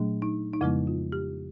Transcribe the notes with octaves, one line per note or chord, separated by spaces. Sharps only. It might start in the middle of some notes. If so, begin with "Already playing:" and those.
Already playing: A#2 F#3 A3 D4
D#4
D#4
F2 C#3 F3 G#3 B3 E4
F4
G4